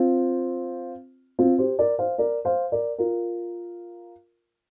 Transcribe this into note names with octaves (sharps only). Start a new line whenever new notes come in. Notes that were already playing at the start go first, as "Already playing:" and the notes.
Already playing: C4 F4
C4 F4
G4 C5
A#4 D5
C5 F5
A#4 D5
C5 F5
A#4 D5
F4 A#4